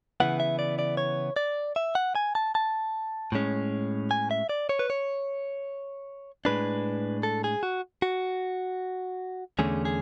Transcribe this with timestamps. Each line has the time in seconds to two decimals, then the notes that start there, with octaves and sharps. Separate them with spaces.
0.20 C#3 E3 B3 E4 F#5
0.40 E5
0.59 D5
0.79 D5
0.97 C#5
1.36 D5
1.76 E5
1.95 F#5
2.15 G#5
2.35 A5
2.55 A5
3.32 A2 G#3 C#4
4.11 G#5
4.31 E5
4.49 D5
4.69 C#5
4.79 B4
4.90 C#5
6.45 A2 G#3 D4 B4
7.23 A4
7.44 G#4
7.63 F#4
8.02 F#4
9.59 E2 D3 A3 C#4 G#4
9.85 G#4